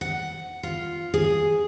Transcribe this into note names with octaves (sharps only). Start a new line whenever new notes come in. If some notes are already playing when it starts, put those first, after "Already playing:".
F#5
F4
G#4